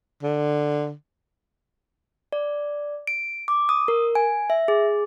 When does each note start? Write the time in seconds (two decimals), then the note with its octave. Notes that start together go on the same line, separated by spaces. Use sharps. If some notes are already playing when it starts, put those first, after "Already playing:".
0.23 D3
2.33 D5
3.07 D7
3.48 D6
3.69 D#6
3.88 A#4
4.15 G#5
4.50 E5
4.68 G#4